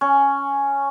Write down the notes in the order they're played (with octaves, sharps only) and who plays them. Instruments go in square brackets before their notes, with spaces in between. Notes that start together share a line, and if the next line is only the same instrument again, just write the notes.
[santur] C#4